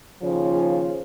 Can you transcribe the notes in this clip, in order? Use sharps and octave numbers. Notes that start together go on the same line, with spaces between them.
D#2 C#3 F3
G#4